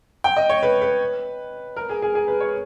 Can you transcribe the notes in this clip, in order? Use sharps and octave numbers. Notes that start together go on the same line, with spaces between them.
G5
D#5
C#5
B4
B4
A#4
G#4
G#4
G#4
B4
C#5